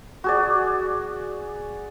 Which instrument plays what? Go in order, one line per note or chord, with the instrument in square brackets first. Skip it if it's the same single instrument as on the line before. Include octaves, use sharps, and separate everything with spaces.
[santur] F#4 G#4 D5